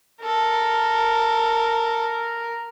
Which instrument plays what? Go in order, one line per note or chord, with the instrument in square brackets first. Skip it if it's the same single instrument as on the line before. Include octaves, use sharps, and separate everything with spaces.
[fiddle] A4 [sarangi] A#4